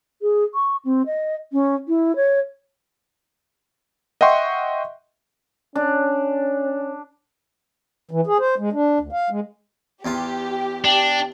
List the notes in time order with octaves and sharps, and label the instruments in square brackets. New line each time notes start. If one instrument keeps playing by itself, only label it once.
[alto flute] G#4
C#6
C4
D#5
C#4
E4
C#5
[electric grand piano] D#5 E5 F#5 G5 C6 C#6
[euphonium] C#4 [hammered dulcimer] D4
[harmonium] E3
G#4
C5
G#3
D4
D2
F5
G#3
[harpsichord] E2 F4 [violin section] G4
[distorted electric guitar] D4 [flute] G5